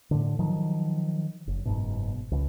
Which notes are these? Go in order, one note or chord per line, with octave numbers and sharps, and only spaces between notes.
A2 D3
D#3 F3 F#3
F#1
F#1 G#2 B2
C#2